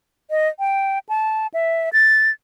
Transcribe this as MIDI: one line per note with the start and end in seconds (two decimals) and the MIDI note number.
0.30 0.49 75
0.59 0.99 79
1.09 1.47 81
1.54 1.89 76
1.93 2.31 93